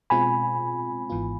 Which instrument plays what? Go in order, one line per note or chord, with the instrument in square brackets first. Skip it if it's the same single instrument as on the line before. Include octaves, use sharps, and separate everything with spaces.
[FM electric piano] B2 G#3 C4 F4 [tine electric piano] G#5 B5
[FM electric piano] G#1 G#2 E3 B3 F4